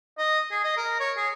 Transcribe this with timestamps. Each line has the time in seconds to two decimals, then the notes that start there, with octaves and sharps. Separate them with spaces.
0.18 D#5
0.51 G#4
0.64 D#5
0.77 A#4
1.00 C#5
1.17 G#4